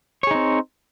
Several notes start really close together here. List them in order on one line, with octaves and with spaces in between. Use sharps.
C#5 G#4 D#4 C4